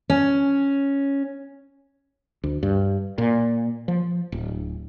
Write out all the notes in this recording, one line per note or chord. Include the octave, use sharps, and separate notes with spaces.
C#4
D2
G2
A#2
F3
D1